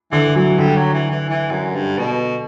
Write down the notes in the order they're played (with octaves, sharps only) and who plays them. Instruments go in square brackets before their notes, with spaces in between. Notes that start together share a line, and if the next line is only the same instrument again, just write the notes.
[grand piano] D3 [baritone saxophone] E3
[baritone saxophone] E3 [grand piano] F#3
[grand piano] D3 [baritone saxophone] G3
[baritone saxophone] F#3
E3
E3
E3
F#2
G2
B2